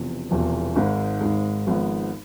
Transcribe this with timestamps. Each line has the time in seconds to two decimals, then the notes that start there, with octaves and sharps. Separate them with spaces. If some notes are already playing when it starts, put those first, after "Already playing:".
Already playing: E1 E2 C3 F3
0.31 E1 E2 C3 F3
0.76 G#1 G#2 G#3
1.21 G#1 G#2 G#3
1.67 G#1 G#2 F3 G#3 B3